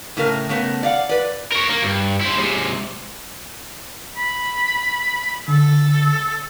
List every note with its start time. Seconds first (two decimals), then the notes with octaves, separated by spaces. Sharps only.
0.17 A2 C#3 A#4
0.49 C#3 A3 B3 A#4
0.83 D5 F5 F#5
1.09 B4 D5
1.52 A#4 C#5
1.69 A#3
1.82 G2
2.21 E4 C5
2.37 G#2 C3
4.16 B5
5.48 D3 A4